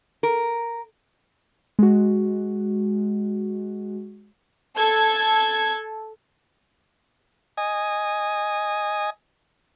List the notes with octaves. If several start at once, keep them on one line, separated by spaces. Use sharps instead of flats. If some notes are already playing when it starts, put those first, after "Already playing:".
A#4
G#3 F#4
A4 G#6
D#5 G#5